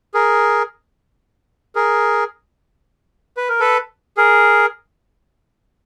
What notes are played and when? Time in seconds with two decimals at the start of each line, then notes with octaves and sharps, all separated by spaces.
0.14 G#4 A#4
1.75 G#4 A#4
3.37 B4
3.49 A#4
3.60 A4 B4
4.17 G#4 A#4